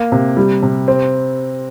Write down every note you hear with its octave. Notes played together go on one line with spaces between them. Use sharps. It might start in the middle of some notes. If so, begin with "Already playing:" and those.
Already playing: A#3
C3
G3
C3
C4